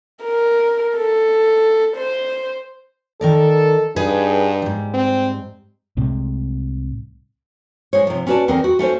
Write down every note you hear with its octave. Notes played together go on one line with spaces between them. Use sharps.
A#4
A4
C5
D#3 A4 A#4 D5
G2 D#4 G#4 B4
G#2 G3
C4
C2 A2 C3 G#3
G#3 C5 C#5
C3 F3
C#4 E4 F#4 B4 D5 A5
E2 C4 A#4 D#5
F#4
A3 C#4 F#4 C5